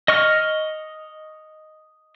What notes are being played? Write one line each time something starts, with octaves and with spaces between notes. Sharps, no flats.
D#5 C#6 F6